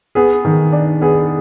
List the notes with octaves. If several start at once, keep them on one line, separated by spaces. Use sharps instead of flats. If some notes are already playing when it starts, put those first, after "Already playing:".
B3 G#4
D#3
D4
B3 G#4